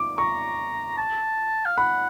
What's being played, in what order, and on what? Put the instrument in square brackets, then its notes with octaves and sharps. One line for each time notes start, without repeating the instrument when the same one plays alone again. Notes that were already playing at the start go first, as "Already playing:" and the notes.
Already playing: [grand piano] D6
[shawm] A#5 [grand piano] C#6
[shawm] A5
F5
[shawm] F#5 [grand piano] B5